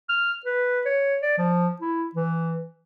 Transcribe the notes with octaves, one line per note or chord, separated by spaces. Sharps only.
F6
B4
C#5
D5
F3
E4
E3